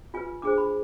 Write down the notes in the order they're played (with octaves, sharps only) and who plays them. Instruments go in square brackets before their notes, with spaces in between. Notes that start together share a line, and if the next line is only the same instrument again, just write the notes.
[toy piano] F4 B4 G#5
D4 G#4 C5 D6
B5